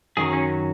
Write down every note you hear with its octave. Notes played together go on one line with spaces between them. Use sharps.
F#2 D#3 F#3 G#4
C#4